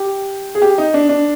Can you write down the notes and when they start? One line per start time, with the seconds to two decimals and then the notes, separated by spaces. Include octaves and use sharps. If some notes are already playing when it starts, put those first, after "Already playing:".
Already playing: G4
0.55 G#4
0.62 G4
0.78 D#4
0.94 D4
1.09 D4